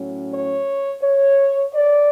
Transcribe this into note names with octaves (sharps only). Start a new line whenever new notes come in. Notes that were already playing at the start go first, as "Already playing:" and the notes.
Already playing: A2 F#3 C#4
C#5
C#5
D5